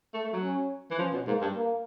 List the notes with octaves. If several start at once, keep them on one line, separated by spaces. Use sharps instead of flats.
A3
A3
F#3
C#4
E3
F3 C#4
B2
G#2 A#3
G2
A#3